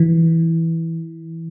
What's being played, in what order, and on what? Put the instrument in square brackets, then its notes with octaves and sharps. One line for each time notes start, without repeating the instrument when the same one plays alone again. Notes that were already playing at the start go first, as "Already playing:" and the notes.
Already playing: [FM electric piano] E3